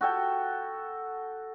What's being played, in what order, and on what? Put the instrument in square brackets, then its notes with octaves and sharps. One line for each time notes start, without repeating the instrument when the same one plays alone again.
[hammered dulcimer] F#4 A4 G5